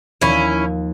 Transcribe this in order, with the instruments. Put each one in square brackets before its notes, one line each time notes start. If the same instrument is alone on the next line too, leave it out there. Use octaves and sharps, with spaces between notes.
[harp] D#2 F3 [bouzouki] C#4 E4